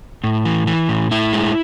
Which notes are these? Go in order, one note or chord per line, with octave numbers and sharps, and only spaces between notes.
A2
E3
E3
A2
A2 E4
G#3